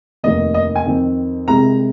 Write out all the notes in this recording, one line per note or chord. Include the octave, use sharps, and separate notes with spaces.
F1 D#2 D#3 A#3 D#5
D#5
G#5
F2 D#3 C4
C2 C3 G#3 A#5